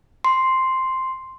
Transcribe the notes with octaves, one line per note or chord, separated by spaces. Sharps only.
C6